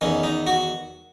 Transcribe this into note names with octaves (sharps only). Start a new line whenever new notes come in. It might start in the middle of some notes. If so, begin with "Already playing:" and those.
E2 D#3 C#4
D#4
F#4